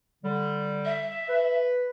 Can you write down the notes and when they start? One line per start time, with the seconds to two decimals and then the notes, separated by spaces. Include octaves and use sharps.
0.24 D3 G3
0.85 E5
1.28 B4